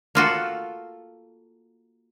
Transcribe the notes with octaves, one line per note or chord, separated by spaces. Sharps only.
A#3 F4 F#4 A4